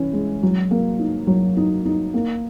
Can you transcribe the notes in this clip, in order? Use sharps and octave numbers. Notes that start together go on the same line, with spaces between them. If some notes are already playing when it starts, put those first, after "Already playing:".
Already playing: E3 C#4
G#3
F#3
A#3
D#4
F#3
D#4
D#4
A#3